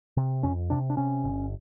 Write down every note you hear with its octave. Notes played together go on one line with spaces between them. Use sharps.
C3
F2 C#4
C3 D4
D4
C3 C#4
G1